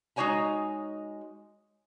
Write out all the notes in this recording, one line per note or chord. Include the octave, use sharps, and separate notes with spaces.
G#3 D#4 F#4 C#5 G#5 A#5